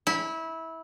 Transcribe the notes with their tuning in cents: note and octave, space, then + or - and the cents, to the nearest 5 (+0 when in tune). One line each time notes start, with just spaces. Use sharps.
E4 -20